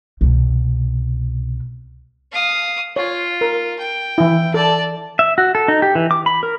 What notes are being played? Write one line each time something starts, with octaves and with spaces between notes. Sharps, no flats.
C2 B2
F5 D#6
F4 C#5
A#4
G5
E3 E4
A4 D5 A5
E5
F#4
A4
D#4
G4
E3
D6
B5
A#4